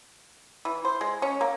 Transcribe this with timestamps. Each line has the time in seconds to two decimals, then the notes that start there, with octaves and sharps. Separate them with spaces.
0.65 E3
0.85 C5
1.01 G#3
1.22 C#4
1.41 A#3